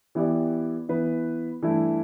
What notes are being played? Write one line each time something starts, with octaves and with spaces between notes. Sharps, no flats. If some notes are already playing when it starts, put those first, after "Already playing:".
E3 B3 E4 G4 D5
E3 B3 E4 B4
G2 E3 A3 E4